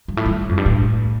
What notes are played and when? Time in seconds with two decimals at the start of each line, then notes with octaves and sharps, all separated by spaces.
0.08 G2
0.17 A2
0.26 G2
0.49 F2
0.57 G2
0.66 A2